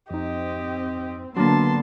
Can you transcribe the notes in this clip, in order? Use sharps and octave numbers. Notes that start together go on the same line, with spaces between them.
F2 C4 D#4 G4 D#5
D3 F#3 A#3 B3 D4 A5 C6